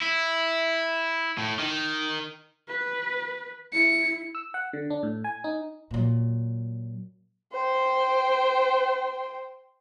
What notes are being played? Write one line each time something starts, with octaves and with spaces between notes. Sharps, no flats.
E4
A2
D#3
B4
E4 C#7
E6
F#5
D3
D4
A2
G#5
D#4
A#2 F#3
C5 G5